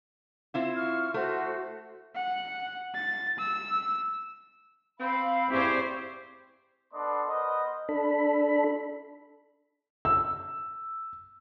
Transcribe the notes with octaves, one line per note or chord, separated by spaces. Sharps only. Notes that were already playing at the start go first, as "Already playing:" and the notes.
C4 E4 F4
C#6 F6
A3 F#4 C5
F#5
A6
E6
C4 F5 B5
C4 E4 G4 G#4 C5 D5 C#6
B3 D4 A4 D5 D#5 C6
B3 A#4 C5 D#5
D4 A4 B5
E6